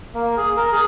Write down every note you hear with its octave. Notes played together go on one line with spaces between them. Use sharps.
A#3
G#4
A#4
G#4